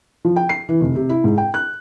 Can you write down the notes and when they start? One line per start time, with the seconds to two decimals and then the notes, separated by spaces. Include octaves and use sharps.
0.25 F3
0.36 G5
0.49 C7
0.69 E3
0.81 F1
0.95 C3
1.09 E4
1.24 G#2
1.38 G5
1.54 F#6